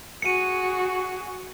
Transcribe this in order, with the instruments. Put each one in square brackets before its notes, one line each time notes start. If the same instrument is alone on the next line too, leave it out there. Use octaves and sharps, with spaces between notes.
[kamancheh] F#4 G#4 [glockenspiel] C#7 D#7